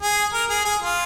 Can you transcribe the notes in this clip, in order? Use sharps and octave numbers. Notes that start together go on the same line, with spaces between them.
G#4
A#4
G#4
G#4
F4